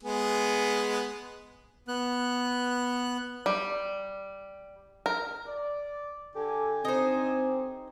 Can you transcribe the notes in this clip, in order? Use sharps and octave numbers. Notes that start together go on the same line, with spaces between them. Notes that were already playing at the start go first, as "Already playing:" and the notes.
G#3 B3 G#4
B3 F#6
G3
A#4
D5
D3 G4 A4 G#5
C4 D#4 C5